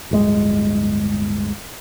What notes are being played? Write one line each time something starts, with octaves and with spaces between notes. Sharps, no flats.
D1 G1 G#3